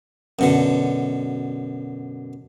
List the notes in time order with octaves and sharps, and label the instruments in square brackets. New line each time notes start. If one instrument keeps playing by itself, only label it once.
[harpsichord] F#2 B2 D3